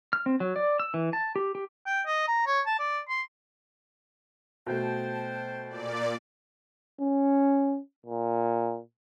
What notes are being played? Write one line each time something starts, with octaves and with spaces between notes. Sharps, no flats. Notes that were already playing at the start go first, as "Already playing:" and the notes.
F6
C4
F#3
D5
E6
E3
A5
G4
G4
G5
D#5
A#5
C#5
A5
D5
C6
B2 A3 C5 G5 A5
A#2 D5
C#4
A#2